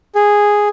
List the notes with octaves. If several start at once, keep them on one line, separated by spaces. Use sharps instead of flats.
G#4